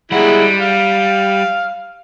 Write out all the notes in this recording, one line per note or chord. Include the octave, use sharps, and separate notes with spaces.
G3 G#3 E4 F#5
F5